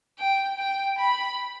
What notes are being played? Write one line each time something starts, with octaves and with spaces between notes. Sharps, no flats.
G5
G5
B5